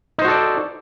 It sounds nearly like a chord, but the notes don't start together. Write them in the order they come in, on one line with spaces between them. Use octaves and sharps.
D#4 C5 F#4 A4 D5